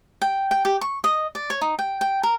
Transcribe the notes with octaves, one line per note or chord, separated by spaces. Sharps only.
G5
G5
G4
C#6
D#5
D5
C#5
D#4
G5
G5
A#4